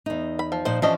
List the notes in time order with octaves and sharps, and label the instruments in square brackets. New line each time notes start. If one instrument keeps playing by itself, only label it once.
[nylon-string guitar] E2 D#4
[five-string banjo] B5
F3
[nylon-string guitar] A#2 F3 D#4 [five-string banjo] C5
[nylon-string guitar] E3 F3 C#4 [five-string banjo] D4 G4 D#5